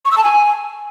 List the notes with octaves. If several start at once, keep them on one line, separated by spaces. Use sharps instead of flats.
C#6
E6
A5
G#5